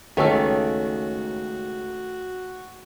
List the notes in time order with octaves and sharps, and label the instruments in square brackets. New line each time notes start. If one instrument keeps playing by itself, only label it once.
[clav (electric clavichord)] C#2 [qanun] D#3 D5 [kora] A3 C#4 A4 [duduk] F#4